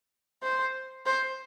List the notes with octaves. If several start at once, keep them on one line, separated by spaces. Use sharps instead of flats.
C5
C5